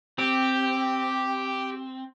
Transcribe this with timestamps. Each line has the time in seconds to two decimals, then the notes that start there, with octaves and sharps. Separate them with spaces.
0.18 C4 G4